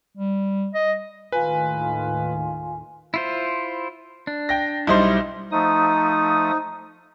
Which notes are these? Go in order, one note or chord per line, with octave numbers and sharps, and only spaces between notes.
G3
D#5
D#2 A2 D#3 F4 B4 G#5
E4 F4 C5
D4
G5 A#6
B1 G3 D#4 E4 C5
F3 A3 D#4 D#6